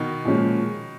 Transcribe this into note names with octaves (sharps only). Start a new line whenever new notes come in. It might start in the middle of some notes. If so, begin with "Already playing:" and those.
Already playing: B2 D#3
A#2 F3 G#3 C#4